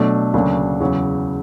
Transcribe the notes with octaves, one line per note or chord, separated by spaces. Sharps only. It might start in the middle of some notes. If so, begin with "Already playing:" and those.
Already playing: B2 F#3 A3 D4
D2 C#3 F#3 A#3 D4
E2 C#3 F#3